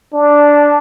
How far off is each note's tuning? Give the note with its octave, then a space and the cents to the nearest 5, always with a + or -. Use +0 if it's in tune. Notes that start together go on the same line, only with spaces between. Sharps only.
D4 -5